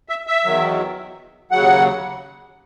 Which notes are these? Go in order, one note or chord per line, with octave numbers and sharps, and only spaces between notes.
E5
E5
E2 D#3 F#3
D#2 C#3 F#3 F#5